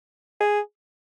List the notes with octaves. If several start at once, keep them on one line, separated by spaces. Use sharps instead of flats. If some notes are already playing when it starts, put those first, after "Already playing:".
G#4